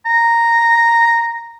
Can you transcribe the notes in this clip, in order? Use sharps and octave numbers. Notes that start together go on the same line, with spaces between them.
A#5